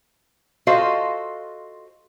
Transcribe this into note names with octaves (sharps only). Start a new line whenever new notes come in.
F4 F#4 A4 C5 D#5 F5